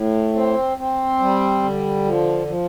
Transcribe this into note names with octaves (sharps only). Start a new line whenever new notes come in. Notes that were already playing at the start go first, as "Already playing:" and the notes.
Already playing: A2
C4
C4
G3
D3
F3
F3